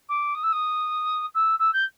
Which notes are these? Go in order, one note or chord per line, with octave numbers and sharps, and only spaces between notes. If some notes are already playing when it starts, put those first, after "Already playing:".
D6
D#6
E6
D#6
E6
E6
G6